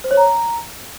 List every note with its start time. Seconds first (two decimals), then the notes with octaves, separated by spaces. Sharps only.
0.04 C5
0.11 C#5
0.17 A#5